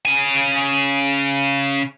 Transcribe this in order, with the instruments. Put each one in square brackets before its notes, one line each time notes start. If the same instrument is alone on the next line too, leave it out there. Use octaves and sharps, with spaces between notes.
[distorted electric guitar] C#3 G#5